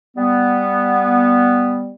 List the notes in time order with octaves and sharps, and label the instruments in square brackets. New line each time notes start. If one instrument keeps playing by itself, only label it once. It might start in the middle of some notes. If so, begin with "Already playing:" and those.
[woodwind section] G3 B3